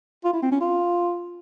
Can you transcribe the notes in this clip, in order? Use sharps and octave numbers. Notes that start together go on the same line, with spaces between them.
F4
E4
C4
C#4
F4